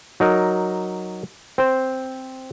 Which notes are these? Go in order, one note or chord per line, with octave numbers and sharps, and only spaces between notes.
F#3 D#4 A#4
C4 C5